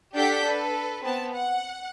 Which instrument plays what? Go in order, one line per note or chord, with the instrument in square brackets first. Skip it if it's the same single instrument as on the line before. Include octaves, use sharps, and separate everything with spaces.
[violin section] D4 G4 A4 F#5 G6 B6
A4 B4
B3 C4 A5
F#5